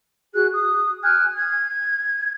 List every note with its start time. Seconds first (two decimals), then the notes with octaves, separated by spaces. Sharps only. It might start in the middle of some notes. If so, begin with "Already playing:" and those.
0.33 F#4 G#4 F#6
0.52 D#6
1.02 G#5 F6 F#6 G#6
1.35 G#6